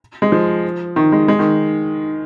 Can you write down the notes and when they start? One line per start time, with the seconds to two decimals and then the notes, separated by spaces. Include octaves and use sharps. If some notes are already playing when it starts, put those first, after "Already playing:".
0.22 G#3
0.32 F3
0.96 D#3
1.12 G#3
1.28 G#3
1.39 D#3